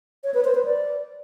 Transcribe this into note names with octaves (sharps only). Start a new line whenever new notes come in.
C#5
B4
C5
B4
D5